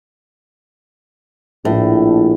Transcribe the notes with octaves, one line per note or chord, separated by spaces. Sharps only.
A#1 A2